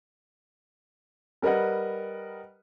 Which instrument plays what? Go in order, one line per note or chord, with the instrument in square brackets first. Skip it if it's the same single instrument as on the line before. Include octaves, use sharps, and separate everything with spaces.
[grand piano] G3 A#4 B4 D#5 F#5